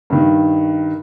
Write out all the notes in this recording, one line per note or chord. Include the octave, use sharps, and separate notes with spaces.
G2 D#3